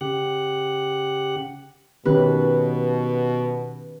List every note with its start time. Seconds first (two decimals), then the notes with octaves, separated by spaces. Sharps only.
0.01 C#3 G4 F#5 F#6
2.06 B2 D#3 C#4 G4 B4